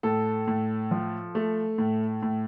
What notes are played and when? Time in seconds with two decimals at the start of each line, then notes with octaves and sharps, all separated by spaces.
0.03 A2 A4
0.48 A2
0.91 F3
1.35 A3
1.78 A2
2.22 A2